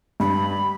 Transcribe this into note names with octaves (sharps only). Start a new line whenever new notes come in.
G2 B5